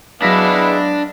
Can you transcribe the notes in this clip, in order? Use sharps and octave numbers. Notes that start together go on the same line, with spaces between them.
F#3 G#3 B3 D4 E4 F5 A#6 B6